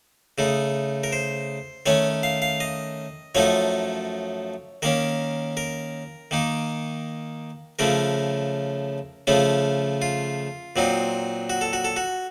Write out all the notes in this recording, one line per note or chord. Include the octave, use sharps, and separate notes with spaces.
C#3 A3 D#4
A#4
C5
D#3 A3 C#4 C#5
F5
F5
D#5
F#2 F3 A3 D#4 C#5
D#3 A#3 C#4 A#4
A#4
D#3 A#3 D#4
C#3 F3 A3 C#4 A#4
C#3 F3 A3 C#4
F4
A#2 F#3 C4 D#4
F#4
A4
F#4
A4
F#4